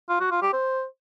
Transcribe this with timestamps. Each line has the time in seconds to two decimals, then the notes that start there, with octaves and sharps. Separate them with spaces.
0.09 F4
0.20 F#4
0.31 F4
0.42 G4
0.53 C5